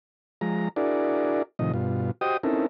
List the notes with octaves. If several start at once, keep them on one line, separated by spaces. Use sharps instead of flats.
F3 G#3 A#5
D4 E4 F#4 G#4 A#4 D5
A2 C3 D#3 F3 D#5
G2 B2 F4
F#4 G4 C5 D#5 G5 D#6
C4 C#4 D#4 E4 A4 A#4